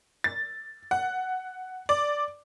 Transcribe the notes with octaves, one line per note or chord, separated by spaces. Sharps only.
A6
F#5
D5